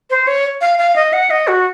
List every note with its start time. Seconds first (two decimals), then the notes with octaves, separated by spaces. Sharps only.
0.10 C5
0.27 C#5
0.61 F5
0.79 F5
0.96 D#5
1.13 F#5
1.30 D#5
1.48 F#4